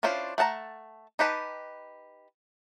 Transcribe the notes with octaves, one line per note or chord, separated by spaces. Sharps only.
C#4 D4 E4 F4 C5
A3 F#5 A5 A#5
D#4 G4 B4 A5